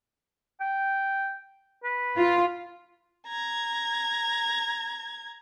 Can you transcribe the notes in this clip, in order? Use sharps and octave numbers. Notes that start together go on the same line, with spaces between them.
G5
B4
F4
A#5 G#6